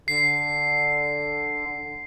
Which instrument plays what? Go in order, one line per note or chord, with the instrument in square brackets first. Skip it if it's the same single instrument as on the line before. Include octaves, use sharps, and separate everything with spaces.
[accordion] D3 [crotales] C7